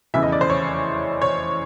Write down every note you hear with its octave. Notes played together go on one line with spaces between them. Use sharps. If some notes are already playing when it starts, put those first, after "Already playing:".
F1 E2 C#3 E3 E5
D#5
D5
C5
C#5
C#5